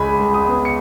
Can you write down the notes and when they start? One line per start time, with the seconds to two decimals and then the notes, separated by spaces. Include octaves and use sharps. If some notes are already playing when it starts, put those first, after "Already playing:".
Already playing: C#2 C#3 G#3 G#5 B5
0.20 G#3
0.34 D#6
0.47 B3
0.65 C#7